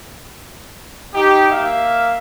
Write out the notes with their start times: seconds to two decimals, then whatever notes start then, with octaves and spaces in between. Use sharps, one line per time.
1.14 D#4 G4
1.51 A#3 E5 F5